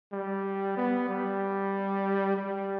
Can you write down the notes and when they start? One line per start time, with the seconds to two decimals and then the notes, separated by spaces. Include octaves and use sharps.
0.13 G3
0.77 B3
1.09 G3
2.37 G3